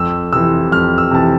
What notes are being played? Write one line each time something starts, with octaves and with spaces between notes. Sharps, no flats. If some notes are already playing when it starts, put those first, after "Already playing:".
Already playing: F2 E6
C3 E3 E6
F2 F6
E6
C3 E3 A5